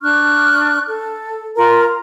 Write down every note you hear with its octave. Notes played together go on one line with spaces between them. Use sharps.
D4 C#6 F6 F#6
A4
F4 A#4 A#5